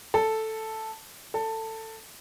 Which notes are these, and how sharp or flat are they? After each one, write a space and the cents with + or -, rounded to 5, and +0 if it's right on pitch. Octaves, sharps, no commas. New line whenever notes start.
A4 +0
A4 +15